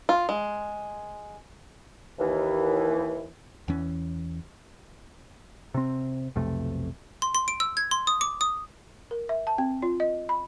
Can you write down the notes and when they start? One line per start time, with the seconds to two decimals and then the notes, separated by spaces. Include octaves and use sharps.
0.09 F4
0.29 G#3
2.19 D#2 E3
3.68 E2 E3 C#4
5.74 C3 C4
6.36 B1 F2 C3 A3
7.22 C6
7.35 C6
7.48 D7
7.60 E6
7.77 G#6
7.91 C6
8.07 D#6
8.21 D6
8.41 D#6
9.11 A#4
9.29 E5
9.47 A5
9.58 C4
9.82 F4
10.00 D#5
10.29 B5